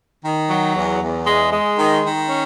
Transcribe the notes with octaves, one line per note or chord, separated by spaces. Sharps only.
D#3
F#3
E2
E2
G#3
G#3
D#3
D#3
C#4